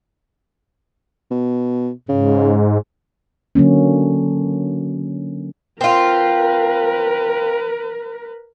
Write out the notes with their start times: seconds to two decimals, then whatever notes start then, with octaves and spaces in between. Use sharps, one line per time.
1.31 B2
2.09 G#2 C#3
3.55 D3 F#3 A#3 C#4
5.81 C4 F4 A#4 B4